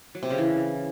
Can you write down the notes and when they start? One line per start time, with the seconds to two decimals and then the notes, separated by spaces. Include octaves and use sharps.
0.15 F#3
0.23 C3
0.30 C#3
0.38 E3